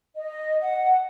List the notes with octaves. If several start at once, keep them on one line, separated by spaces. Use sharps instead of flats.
D#5
F#5